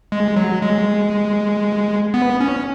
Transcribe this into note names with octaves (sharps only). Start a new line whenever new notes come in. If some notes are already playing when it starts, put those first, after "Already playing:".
G#3
F#3
G#3
B3
C#4